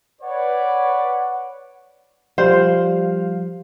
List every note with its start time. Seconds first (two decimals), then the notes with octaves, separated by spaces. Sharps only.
0.22 B4 C#5 D5 F#5
2.38 F3 G3 C5 F5